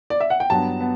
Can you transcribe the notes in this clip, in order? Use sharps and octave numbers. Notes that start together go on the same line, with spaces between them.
D5
E5
F#5
G5
G2 F#3 B3 A5
B3